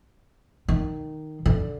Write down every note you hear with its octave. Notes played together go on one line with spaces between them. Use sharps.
D#3
D3